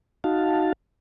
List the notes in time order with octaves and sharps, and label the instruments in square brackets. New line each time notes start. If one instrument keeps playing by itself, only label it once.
[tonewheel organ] D#4 F#4 F5 A5